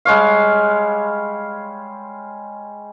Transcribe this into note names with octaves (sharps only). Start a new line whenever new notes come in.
G3 G#3 C#5 F5